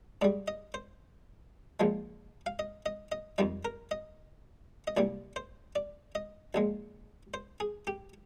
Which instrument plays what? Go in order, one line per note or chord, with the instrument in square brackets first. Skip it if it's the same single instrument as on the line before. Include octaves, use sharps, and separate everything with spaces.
[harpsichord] G#2 G3 D5
D#5
C5
A#1 A#2 F3 G#3
F5
D#5
D#5
D#5
F2 D#3 G3 D5
A#4
D#5
D#5
C2 A#2 G3 D5
C5
D5
D#5
A#1 A#2 G#3
C5
G#4
G4